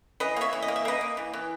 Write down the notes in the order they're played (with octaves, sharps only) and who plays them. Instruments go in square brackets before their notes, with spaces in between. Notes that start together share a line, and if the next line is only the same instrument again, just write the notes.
[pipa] E3 B4 D#5
A#3 C#5 E5
E3
D#5
A#3
E5
A#3 B4 D#5
A#3
E3
E3